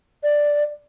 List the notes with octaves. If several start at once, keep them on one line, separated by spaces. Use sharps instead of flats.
D5